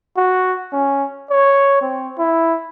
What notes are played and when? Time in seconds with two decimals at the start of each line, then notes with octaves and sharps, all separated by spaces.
0.17 F#4
0.73 C#4
1.30 C#5
1.81 C4
2.19 E4